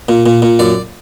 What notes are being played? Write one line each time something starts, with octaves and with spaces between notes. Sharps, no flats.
A#2
A#2
A#2
F#2 D5